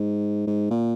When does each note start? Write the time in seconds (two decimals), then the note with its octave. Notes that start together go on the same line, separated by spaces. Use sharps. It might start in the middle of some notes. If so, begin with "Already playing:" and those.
Already playing: G#2
0.47 G#2
0.70 A#2